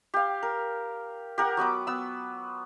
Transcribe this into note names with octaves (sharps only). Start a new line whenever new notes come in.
G4 F5
A#4
G4 A#4 F#5
F#3 B3 B4 D6
B3 E6